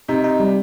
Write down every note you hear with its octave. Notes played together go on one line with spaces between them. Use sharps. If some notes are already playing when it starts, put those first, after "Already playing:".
C3 D#4
D#4
G3